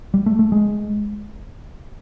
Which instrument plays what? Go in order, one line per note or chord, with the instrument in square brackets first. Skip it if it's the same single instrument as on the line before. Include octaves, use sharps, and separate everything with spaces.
[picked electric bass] G3
A3
A3
G#3